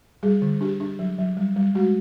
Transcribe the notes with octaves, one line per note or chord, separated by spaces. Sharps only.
G3 G#4
D3
D4 G4
D4
F#3
F#3
G3
G3
G#3 F#4